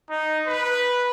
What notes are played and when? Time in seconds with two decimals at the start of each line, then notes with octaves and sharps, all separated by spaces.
0.10 D#4
0.47 B4